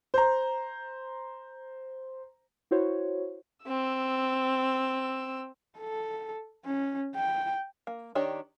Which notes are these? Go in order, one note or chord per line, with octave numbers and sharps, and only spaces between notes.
C5 A#5
E4 F#4 C5 C#5
C4 E6
A4
C#4
G5
A#3
D#3 D4 G4 C#5 A#5